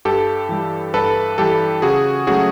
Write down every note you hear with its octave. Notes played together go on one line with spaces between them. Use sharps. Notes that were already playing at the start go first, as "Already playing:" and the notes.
G2 G4 A4
E3 G3
G2 A4 B4
E3 G3 G4 A4
C#3 F#4 G#4
F#3 A3 C#4 F#4 G#4